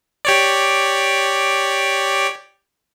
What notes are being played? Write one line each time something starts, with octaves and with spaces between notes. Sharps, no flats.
G4 C#5 D5